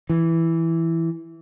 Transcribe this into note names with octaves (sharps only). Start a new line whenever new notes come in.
E3